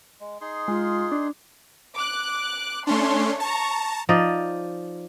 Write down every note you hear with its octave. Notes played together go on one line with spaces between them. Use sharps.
G#3
D#4 G#4 C6
G#3 F4
D4
D6 F#6
A3 C#4 D4 C#5 C6
A5 A#5 C#6
F3 D#4 D5 D#5